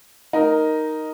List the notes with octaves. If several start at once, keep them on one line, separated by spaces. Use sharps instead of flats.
D#4 A#4